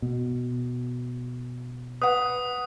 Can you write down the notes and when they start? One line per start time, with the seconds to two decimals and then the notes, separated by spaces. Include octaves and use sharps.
0.02 B2
2.02 B4 F#5 D#6